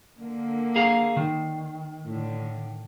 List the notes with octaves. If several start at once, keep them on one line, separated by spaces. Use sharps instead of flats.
D3 A#3
G#4 F5 A#5
D#3
A2 D3